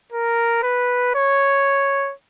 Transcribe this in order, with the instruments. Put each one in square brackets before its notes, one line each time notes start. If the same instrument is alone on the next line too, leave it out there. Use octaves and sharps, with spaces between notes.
[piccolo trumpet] A#4
B4
C#5